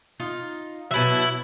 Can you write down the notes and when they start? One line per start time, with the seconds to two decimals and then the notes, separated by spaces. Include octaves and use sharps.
0.20 D#4 F4
0.91 B2 F#3 E5 B5